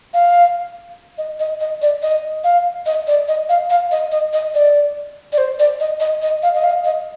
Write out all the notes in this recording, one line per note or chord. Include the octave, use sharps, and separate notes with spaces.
F5
D#5
D#5
D#5
D5
D#5
F5
D#5
D5
D#5
F5
F5
D#5
D#5
D#5
D5
D5
C5
D5
D#5
D#5
D#5
F5
D#5
F5
D#5